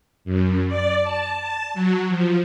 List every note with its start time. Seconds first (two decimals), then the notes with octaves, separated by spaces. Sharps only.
0.25 F#2
0.67 D5
1.03 A5
1.41 A5
1.74 F#3
2.08 F3